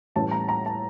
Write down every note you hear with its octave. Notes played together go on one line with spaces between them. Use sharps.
A2 E3 G3 C#4 E4 A5
A#5
A#5
A5